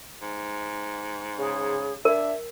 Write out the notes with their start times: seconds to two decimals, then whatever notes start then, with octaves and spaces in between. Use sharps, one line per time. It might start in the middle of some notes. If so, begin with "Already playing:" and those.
0.22 G#2
1.38 C#3 G#4
2.05 D4 A#4 E5